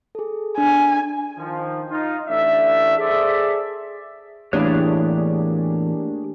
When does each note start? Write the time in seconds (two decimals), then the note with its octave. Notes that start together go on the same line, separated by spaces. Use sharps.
0.15 G#4 A4
0.58 D4 G#5
1.38 D#3 F3
1.90 D#4 F4
2.27 A1 A3 D4 E5
2.98 G#4 A4 C5 D5 E5
4.53 E2 A2 A#3 D4 G4 G#4 C#5 F#6